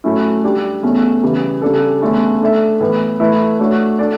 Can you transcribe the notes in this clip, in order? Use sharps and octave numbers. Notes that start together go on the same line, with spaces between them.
A2 F#3 A3 C#4 E4
G3 D4 G4
E2 B2 A3 C#4
C#3 E3 G3
C#3 G3 D4 A4
E2 D3 A3 C#4
A3 D4 A4 E5
A2 E3 B3
E3 A3 E4 B4
A3 D4 F#4 C#5
D4 A4 D5